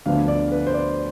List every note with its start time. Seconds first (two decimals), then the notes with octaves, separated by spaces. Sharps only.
0.06 D2 D3 F3 B3 D4 F5
0.28 D5
0.52 B4
0.67 C5
0.74 D5